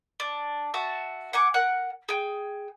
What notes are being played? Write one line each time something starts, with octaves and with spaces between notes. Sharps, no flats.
D4
F#4 E5 A5
F#5 G#5 C#6 D6
A#4 F#5 F#6
G#4 G5